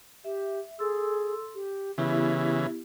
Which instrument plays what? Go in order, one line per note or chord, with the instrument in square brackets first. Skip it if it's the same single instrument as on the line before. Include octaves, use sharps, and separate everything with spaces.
[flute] G4 [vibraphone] E5
[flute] G#4 [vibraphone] A4 C6 E6
[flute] G4
[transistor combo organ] C#3 E3 [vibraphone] B3 E4 G4 [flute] E5